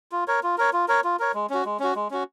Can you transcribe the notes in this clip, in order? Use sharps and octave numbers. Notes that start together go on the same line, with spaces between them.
F4
A#4 C#5
F4
A#4 C#5
F4
A#4 C#5
F4
A#4 C#5
G#3
C#4 F#4
G#3
C#4 F#4
G#3
C#4 F#4